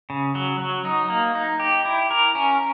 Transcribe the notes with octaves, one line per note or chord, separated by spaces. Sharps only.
C#3
F#3
F#3
D#4
A#3
D#4
G4
E4
A#4
C#4